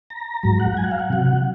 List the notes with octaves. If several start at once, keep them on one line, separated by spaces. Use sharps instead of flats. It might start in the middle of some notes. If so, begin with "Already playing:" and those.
A#5
G#2 F#3 A#5
F#5
G#5
F#5
F5
F#5
C3 F#3